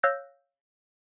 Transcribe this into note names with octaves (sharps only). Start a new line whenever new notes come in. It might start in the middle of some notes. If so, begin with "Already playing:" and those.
C#5 F5 E6 F#6 G6 A#6